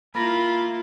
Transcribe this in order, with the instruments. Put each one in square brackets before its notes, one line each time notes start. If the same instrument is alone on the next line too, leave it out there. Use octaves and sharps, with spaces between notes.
[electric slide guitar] A#3 A#4 [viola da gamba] E4 F4 [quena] B5